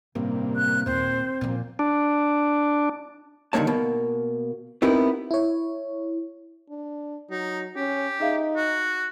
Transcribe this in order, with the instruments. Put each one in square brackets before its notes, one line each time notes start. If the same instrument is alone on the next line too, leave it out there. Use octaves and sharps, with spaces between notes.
[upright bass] A1 [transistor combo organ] G2 C3 A#3
[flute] F#6
[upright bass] D#2 A#2 [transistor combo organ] C4 [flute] C5
[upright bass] A#2 F3
[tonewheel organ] D4
[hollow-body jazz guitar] G2 D3 D#3 A#3 C#5 A5
B2 A#3
B3 C4 D#4 E4 G4 A#4
[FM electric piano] E4 C#5
[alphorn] D4
[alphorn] F#3 [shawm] D#4
[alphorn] C#4 [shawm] G4
[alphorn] D#4 [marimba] G#4 E5 F5
[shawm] F#4